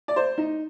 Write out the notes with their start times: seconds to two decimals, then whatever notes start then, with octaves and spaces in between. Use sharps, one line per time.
0.08 D5
0.16 C5
0.38 D#4